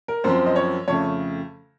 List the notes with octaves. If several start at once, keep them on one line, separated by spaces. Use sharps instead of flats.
A#4
F#2 F3 C4 C5
D#5
C#5
F2 C#3 A3 C#5